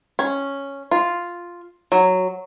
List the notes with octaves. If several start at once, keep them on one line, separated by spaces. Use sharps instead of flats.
C#4
F4
F#3